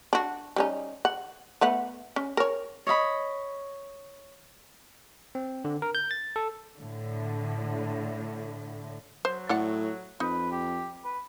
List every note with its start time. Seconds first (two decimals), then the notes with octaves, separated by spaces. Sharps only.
0.13 D4 F#4
0.56 G3 C#4 D#4
1.05 F#5
1.61 A3 B3 F#5
2.16 C#4
2.37 A#4 C#5
2.87 C#5 D#5 E5 B5
5.35 C4
5.65 D3
5.82 A#4
5.95 G6
6.11 A6
6.36 A4
6.77 A2 D3
9.25 F#3 C5
9.49 A2 A4 D5 F#5
10.20 F2 D#4 B4
10.52 G4
11.04 B4